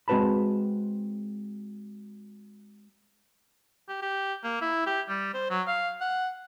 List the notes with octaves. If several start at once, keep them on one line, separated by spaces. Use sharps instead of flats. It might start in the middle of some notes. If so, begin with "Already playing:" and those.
G#3 C4 F#4 B4 A5 B5
G4
G4
A#3
E4
G4
G3
C5
F#3
F5
F#5